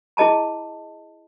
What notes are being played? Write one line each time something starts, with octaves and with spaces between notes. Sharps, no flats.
E4 G#4 D#5 A5 A#5